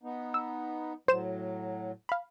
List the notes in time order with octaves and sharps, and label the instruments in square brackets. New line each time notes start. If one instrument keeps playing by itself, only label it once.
[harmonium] B3 D#4
[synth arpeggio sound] E6
[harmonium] A2 F#3 [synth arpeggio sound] C5 E7
[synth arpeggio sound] F5 B5